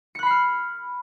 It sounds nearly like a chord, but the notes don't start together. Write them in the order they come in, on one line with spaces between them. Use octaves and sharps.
C#7 F#6 B5 C7 F6